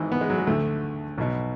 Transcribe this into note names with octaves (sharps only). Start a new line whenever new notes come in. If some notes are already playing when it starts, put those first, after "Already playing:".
Already playing: G#1 G#2 E3
B3
G#3
F#3
G#3
D2 D3 A3
B1 B2